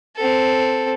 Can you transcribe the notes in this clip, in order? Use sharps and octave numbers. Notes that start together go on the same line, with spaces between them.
C4 A4